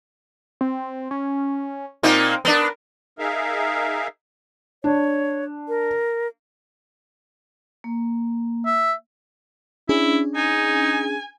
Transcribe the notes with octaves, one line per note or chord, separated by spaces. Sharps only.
C4
C#4
A#2 A#3 C4 D#4
B3 D4 A#4
D#4 G#4 A#4 E5 F5
D4 C#5
A#4
A#3
E5
C#4 D4 E4 G#4
D#4 G#5